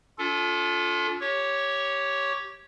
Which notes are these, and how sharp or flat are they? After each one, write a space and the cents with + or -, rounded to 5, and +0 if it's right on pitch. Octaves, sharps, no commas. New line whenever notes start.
D4 -45 F4 +10 A4 +0
G4 -10 C#5 +0 C#6 +0